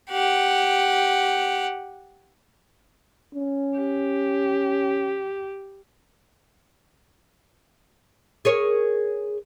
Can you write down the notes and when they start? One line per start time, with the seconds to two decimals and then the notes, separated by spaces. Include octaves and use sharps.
0.11 G4 F#5
3.34 C#4
3.77 G4
8.45 G#4 A#4 C#5